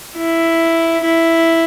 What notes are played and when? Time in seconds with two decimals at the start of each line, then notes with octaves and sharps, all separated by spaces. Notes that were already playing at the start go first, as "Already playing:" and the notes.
0.16 E4
1.04 E4